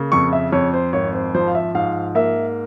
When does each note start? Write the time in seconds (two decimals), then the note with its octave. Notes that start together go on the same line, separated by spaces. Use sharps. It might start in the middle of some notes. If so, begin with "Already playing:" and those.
Already playing: C#3 A#3
0.12 F2 C#6
0.33 E5
0.52 F2 C#5
0.74 C5
0.93 G#1 C#5
1.14 C5
1.34 F3 C5
1.47 F5
1.55 E5
1.75 G#2 F5
2.15 A#3 E5